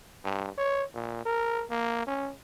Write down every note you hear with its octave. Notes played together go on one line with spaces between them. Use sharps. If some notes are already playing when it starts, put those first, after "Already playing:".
G2
C#5
A#2
A#4
A#3
C#4